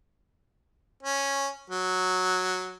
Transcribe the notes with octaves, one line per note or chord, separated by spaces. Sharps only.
C#4
F#3